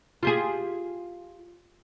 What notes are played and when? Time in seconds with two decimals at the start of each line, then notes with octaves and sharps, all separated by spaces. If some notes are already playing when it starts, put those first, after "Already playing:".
0.23 F4 G4 G#4